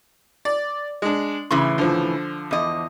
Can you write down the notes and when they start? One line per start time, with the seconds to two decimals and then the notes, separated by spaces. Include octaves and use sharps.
0.45 D5
1.02 G#3 D4
1.51 A2 C#3 E3 C6
1.78 D3 F3
2.51 E2 D#5